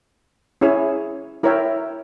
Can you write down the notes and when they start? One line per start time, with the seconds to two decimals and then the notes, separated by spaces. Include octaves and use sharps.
0.61 C#4 E4 G#4 C#5
1.43 E4 A#4 C#5 E5 G5